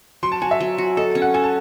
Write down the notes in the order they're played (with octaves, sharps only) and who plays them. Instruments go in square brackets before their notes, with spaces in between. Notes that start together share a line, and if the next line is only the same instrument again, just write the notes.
[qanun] F#3 [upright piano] C6
[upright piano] A5
[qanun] F#4 [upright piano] G#5
[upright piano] E5
[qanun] F#3
F#4
[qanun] A4 [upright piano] D#5
[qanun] C#4
[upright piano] F#5
[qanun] A4 [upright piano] G#5
[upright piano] A5